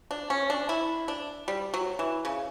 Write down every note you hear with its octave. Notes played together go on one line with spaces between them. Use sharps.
D4
C#4
D4
E4
D4
G3
F#3
E3
C#3